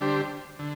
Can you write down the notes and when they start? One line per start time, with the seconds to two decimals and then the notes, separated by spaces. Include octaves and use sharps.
0.01 D3 G3 D4 G4 C5
0.59 D3